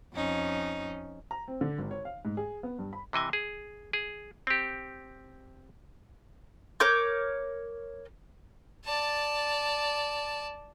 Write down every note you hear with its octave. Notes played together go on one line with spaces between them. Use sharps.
F2 C#4 D#4
A#5
C4
D3
G#1
C#5
F5
G#2
G#4
B3
G2
B5
C3 E3 D#5 G#5
G#4
G#4
C4 G4
A#4 C#5 D6 G6
D5 A5